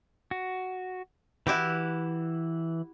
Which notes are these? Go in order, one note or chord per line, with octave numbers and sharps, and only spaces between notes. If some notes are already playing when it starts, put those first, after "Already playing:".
F#4
E3 E4 F#4 G4 F#6